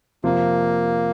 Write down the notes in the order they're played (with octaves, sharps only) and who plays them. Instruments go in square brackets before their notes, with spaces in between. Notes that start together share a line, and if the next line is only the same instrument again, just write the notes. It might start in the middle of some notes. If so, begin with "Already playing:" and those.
[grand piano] F2 C3 F3 C4 [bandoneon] A#3